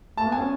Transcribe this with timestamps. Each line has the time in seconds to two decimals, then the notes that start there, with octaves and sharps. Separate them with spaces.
0.17 A3 A5
0.28 B3
0.32 G#5
0.38 C#4